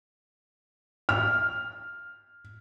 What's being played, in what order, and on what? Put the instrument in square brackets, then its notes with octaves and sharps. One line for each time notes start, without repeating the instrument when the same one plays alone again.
[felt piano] F6